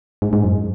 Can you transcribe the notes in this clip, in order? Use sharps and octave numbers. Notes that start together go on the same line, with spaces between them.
G#2
G#2
F#2